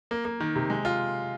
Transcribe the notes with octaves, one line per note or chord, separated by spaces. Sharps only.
A#3
A#3
D#3
C3
G#3
F4